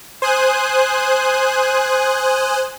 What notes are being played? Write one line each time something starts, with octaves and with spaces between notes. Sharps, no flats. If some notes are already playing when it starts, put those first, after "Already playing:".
C5 G#5 D#6 F#6